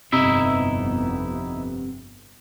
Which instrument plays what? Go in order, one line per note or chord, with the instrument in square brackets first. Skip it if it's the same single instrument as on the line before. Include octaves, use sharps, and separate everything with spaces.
[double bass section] G1 F2 B3 [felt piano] C3 [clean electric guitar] D#4 E4 E5